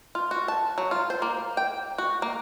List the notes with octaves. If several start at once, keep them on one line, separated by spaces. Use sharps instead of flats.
F4
F#4
A5
F#3
F4
C5
A#3
G5
F#4
A#3